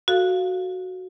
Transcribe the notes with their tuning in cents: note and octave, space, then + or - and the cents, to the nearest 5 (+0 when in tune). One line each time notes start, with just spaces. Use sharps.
F#4 +0 A4 +0 F5 +0